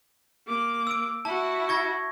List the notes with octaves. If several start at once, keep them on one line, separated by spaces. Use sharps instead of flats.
A#3 D6
E6 D7
E4 F#4 A5
C#6 G#6 A#6